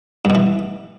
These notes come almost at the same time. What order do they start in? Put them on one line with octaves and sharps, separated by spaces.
G2 B2 E3